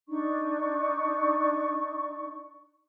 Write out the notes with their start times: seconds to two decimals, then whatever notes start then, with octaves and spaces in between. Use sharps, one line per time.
0.09 D4 D#4 D5 C#6